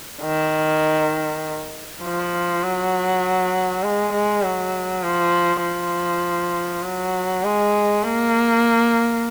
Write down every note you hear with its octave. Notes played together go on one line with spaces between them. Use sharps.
D#3
F3
F#3
G#3
G#3
F#3
F3
F3
F#3
G#3
A#3